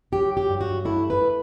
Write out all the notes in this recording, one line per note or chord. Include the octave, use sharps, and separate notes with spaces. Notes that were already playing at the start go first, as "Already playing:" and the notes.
F#3 G4
G4
G2
F#4
A3 E4
B4